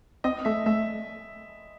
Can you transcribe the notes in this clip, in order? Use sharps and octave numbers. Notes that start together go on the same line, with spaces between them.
C4 D#5
A3 E5
A3 E5